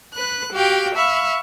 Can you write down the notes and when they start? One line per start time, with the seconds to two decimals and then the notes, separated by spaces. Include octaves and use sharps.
0.13 B4 F#6
0.53 F#4 G4 F5 G5
0.95 E5 F5 B5 C#6